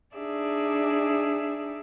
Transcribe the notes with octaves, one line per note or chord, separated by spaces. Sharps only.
D4 D#4 G#4 D5 E5